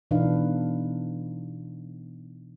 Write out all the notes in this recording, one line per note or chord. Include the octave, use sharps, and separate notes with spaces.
B2 E3 D4 D#4 B4 F5